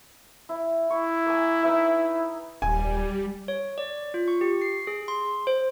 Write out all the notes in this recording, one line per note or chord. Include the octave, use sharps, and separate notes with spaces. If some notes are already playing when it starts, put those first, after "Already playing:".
E4
E4 C#6
A#3 G#5
D#4 B4 E5
D#1 G3 G#5
C#5
D5
F4
C#6
G4
C7
G#4
C6
C5